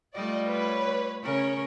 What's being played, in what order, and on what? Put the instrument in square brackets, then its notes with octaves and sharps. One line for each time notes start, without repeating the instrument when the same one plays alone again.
[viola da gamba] G3 A3 F4 [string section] D5 D#5
[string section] B4 C#5
[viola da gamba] C#3 C#4 A#4 [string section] C#5